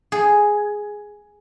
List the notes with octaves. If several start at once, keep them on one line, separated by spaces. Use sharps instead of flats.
G#4